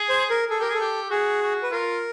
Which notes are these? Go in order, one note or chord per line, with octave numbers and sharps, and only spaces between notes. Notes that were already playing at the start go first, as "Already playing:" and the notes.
Already playing: G#4
C5
A#4
G#4 A4
G4 A#4
G#4
A4
G4
F#4 G#4
F#4
B4
F4 A#4